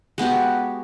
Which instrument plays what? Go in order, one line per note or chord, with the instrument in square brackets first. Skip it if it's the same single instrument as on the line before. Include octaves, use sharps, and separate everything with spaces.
[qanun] G#3 B3 F#4 G4